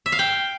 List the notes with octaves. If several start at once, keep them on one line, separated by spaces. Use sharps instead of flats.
E5
F5
G5